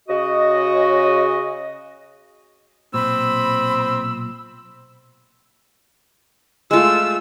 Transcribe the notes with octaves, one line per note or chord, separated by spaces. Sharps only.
C#3 F#4 D#5
B1 A#2 C4 B5 E6
G#3 A3 F4 E6